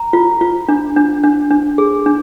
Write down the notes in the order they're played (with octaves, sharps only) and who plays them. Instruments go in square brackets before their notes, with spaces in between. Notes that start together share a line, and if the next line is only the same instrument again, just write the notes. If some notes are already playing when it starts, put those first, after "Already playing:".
Already playing: [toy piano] A#5
F4
F4
D4
D4
D4
D4
G#4
D4